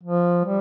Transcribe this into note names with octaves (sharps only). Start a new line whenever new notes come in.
F3
G3